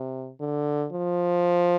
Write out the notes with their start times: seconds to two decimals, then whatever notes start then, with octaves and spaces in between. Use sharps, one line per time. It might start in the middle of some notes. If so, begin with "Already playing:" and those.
Already playing: C3
0.40 D3
0.92 F3